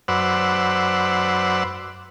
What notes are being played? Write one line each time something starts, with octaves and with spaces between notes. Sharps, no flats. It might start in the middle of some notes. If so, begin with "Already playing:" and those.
F#2 B4 C5 D5 F#5 E6